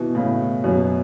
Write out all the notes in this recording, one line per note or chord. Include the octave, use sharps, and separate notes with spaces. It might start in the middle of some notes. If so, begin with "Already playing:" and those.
Already playing: B2 E3
A2 C#3
F#2 B2